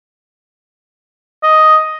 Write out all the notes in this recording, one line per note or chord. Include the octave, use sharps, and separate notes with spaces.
D#5